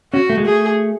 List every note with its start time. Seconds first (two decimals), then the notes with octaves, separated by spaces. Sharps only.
0.13 C#4 F#4
0.30 A3
0.37 G#3
0.45 A3 G#4